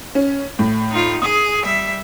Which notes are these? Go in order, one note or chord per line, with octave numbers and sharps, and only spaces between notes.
C#4
A2
D#4 F4
G#4 D#6
G3 E5